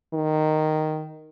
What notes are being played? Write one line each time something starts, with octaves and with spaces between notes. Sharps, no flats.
D#3